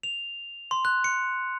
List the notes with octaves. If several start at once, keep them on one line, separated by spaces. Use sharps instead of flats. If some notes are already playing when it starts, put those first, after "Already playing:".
F7
C6
F#6
C#7